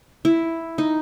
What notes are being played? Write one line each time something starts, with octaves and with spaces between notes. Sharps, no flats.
E4
D#4